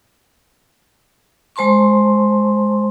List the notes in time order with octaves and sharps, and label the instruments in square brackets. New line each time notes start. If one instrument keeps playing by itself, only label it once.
[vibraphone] G#3 C5 A5 C6 C#6